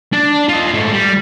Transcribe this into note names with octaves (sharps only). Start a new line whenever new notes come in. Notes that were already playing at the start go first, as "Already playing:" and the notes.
D4
F4 D#5
G#2 A3
G3